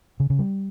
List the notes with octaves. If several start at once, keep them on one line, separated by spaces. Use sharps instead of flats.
C#3
C#3
G3